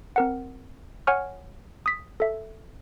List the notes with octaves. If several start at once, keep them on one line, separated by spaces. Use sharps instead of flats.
C4 A#4 F#5
C#5 F#5 G#5 C#6 F6
D#6 B6
A4 E5